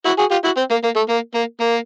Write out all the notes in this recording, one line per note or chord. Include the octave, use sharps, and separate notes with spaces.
E4 F#4
F#4 G#4
F4 G4
E4 F#4
C4
A#3
A#3
A3
A#3
A#3
A#3